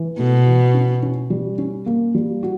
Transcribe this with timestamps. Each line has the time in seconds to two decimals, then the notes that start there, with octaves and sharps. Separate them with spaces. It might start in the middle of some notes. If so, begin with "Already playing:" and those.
Already playing: E3
0.18 B2 A3
0.46 E3
0.74 C#4
1.03 C#4
1.30 G3
1.58 C#4
1.86 A#3
2.15 G3
2.43 F#4